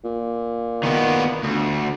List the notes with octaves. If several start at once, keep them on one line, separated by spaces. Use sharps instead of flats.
A#2
D#3 B3
D2